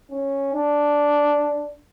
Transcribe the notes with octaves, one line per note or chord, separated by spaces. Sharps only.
C#4
D4